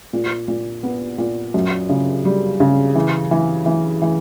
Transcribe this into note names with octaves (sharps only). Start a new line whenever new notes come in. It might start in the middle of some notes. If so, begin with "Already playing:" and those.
A#2
A#2
B3
A#2
F#2
C#3
G3
C#3
E3
E3
E3
E3